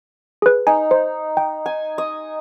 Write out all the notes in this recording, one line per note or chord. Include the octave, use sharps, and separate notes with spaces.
G#4 B4
D#4 G#5
C5
G5
G#5
D#5